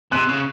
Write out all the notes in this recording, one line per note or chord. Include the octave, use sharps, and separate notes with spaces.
C3 F#6
C#3